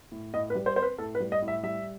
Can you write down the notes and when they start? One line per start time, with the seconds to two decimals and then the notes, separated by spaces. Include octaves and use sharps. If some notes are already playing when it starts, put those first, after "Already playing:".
0.12 A2
0.34 A2 D#5
0.50 B4
0.55 G3
0.66 C5
0.76 C4 C5
0.82 B4
0.98 A2 A4
1.15 B4
1.20 G3
1.32 D#5
1.42 A2
1.48 E5
1.63 G3 E5